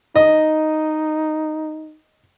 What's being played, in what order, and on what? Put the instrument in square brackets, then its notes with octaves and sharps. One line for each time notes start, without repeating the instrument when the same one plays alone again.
[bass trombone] D#4 [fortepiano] D#5